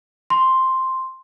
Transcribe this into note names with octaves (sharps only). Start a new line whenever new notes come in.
C6